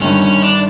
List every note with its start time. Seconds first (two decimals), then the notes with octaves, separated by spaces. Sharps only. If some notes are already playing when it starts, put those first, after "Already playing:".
0.01 G1 G2 D#3 C#4
0.22 C#4
0.42 D4